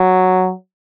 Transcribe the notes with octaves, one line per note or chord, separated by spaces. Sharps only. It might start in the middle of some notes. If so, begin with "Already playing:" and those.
Already playing: F#3